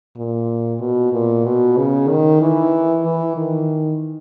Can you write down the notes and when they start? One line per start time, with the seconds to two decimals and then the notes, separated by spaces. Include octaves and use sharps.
0.17 A#2
0.80 B2
1.13 A#2
1.45 B2
1.77 C#3
2.09 D#3
2.42 E3
3.05 E3
3.37 D#3